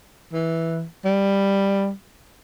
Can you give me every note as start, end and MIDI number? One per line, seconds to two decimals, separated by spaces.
0.33 0.84 52
1.05 1.91 55